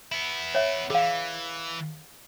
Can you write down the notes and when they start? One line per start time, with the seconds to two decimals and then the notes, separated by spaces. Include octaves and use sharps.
0.12 B3 E4
0.55 C#5 E5
0.90 E3 G#4 F5